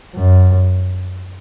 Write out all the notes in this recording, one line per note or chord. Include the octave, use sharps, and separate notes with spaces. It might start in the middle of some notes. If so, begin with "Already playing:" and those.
F#2